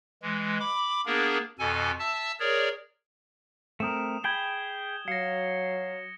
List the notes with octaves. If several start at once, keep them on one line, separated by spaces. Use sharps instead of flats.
E3 G#3
B5 D6
A#3 B3 D4 G#4 A#4
F2 B2 A4 G#5
E5 A5 E6
G#4 A#4 C#5 D5
A3 C4 A#4 D#6 E7
G#4 G5 B5 G#6 G7
F#3 F5 A#6 C#7